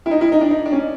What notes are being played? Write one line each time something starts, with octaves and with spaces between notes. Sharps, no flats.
E4
D#4
E4
D#4
D4
D#4
D4
C#4